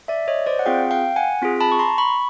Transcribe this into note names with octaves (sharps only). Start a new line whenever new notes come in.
D5 E5
C#5 D#5
C5 D5
F#5
C4 F4 G#4 F5 G5
F5 G5
F#5 G#5
C4 F4 G#4
A5 B5
C#6
A#5 C6
B5 C#6